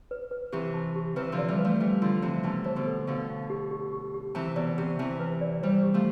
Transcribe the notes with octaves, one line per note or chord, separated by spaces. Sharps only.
B4
B4
C3 E3 G4
A5
G4
C3 E3 B4
D3 F3
D5
E3 G3
B4
F3 A3
E3 G3 E5
D3 F3 F4
C3 E3 E5
B2 D3 A5
E3 C5
B2 D3
A4
B2 D3 F5
F5
G4
G4
G4
G4
C3 E3 A5
B2 D5
C3 G4
C3 E3 A5
B4
D5
E3 G3 C5
G4
F3 A3